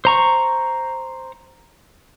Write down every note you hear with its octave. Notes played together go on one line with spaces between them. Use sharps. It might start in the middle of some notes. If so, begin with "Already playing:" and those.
C5 A#5 C#6